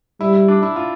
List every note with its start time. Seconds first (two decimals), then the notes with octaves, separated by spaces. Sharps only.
0.20 G3 E4
0.34 E4
0.48 D4
0.62 E4
0.76 F4